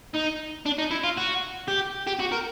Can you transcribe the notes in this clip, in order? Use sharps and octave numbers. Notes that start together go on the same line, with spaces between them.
D#4
D4
D#4
E4
F4
F#4
G4
G4
F#4
A#4